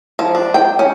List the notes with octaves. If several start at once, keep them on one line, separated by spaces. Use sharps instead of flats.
F3
D4
G5
C#4